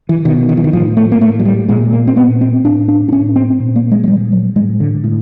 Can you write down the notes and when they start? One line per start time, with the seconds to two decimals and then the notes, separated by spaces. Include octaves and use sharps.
0.09 E3
0.25 B2 D#3
0.49 D#3
0.57 E3
0.64 D#3
0.73 A2 F3
0.97 A3
1.12 A#3
1.21 A2 A3
1.39 F#3
1.45 G3
1.69 A#2 G#3
1.92 A#3
2.07 C4
2.16 A#2 B3
2.41 C4
2.64 A2 D4
2.88 D4
3.08 D4
3.12 A2 C#4
3.36 C4
3.60 A#2
3.76 A#3
3.91 G#3
4.04 F#3
4.07 A#2 G3
4.32 F#3
4.56 A2 G#3
4.80 D3
5.04 A2